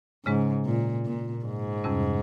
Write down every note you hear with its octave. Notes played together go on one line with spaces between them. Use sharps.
G#2 C#3 G#3 C#4
A#2
A#2
G#2
F2 C3 G3 C#4